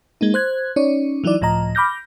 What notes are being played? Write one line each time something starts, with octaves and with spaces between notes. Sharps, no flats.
G#3 A#3 D#4
C5 F#6 G#6
C#4 D#4 C#5 D5
E3 F#3 D#4 E4 D5
C#2 A2 F3 D#5 A#5
B5 D6 F6 G6 A#6